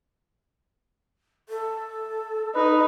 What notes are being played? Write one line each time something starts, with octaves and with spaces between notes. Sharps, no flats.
A4
D#4 B4